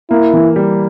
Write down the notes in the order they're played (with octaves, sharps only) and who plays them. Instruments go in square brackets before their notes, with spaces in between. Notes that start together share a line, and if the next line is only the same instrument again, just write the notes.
[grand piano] A#3 [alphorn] E4
[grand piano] E3
G3